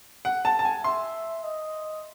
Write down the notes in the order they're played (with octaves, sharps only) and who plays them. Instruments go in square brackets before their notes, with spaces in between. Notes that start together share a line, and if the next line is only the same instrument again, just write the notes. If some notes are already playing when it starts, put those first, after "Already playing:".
[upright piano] F#5
A5
A5
G#5
[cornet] E5 [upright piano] C6
[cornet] D#5